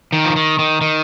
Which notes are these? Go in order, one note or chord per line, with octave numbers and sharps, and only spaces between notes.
D#3
F3
D#3
D#3
D#3